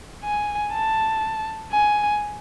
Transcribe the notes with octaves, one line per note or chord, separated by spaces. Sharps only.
G#5
A5
G#5